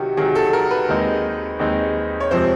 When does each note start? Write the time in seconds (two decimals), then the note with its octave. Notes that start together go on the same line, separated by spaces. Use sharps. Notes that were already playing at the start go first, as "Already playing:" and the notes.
Already playing: C3 D#3 F#3 F#4 G4
0.17 C3 D#3 F#3 G#4
0.35 A4
0.53 A#4
0.71 B4
0.88 D#2 D#3 G#3 C4 D#4
1.59 D#2 D#3 G#3 C4 D#4
2.20 C#5
2.31 F2 C3 F3 G#3 C4 C5